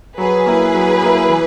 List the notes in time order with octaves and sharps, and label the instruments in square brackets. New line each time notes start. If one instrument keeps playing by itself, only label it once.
[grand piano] F#3 [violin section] G#4 B4
[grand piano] A#3 E4
F#3
A#3 E4
E3